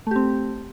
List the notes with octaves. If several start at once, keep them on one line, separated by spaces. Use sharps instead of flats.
A3 C4 G4